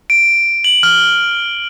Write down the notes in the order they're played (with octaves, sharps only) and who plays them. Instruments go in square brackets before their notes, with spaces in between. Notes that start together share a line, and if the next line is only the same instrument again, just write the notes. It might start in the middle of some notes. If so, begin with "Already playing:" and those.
[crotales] D7
F#7
F6